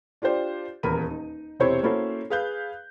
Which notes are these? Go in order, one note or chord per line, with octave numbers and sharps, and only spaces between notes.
D4 F4 G4 C5 D5
D#1 E2 A#4 A#5 B5 D#7
D#4
E1 C3 C4 E4 C5 C#5
A#3 C#4 E4 F#4 A4 C5
G#4 B4 F5 F#6 G6